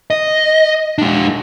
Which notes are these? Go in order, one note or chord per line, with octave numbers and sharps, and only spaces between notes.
D#5
G#3 D4